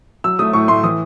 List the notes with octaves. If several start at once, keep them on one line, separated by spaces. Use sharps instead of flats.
F#3 E6
A3 D#6
A2 C#6
A2 C6
E3 D#6